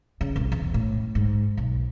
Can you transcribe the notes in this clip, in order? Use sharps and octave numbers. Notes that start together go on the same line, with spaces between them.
C#3
C2
E2
A2
G#2
B1